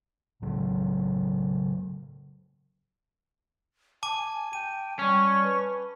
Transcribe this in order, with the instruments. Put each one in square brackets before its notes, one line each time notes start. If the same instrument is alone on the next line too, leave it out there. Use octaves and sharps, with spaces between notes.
[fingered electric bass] A2 C#3 F#3
[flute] G#5 [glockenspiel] A5 D6 D#7
[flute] G5 [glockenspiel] D#7
[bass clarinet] G3 [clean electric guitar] C#4 [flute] C#6
[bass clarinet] B4